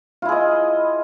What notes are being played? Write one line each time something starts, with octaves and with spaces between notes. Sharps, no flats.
E4 F4 G#4 D#5